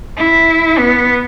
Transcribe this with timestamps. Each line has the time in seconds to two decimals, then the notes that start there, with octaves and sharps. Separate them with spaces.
0.17 E4
0.79 B3